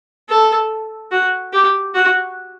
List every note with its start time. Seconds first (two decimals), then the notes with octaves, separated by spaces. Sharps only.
0.29 A4
1.12 F#4
1.53 G4
1.94 F#4